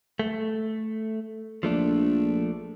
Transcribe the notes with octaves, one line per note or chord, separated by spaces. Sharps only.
A3
A#1 F3 A3 D4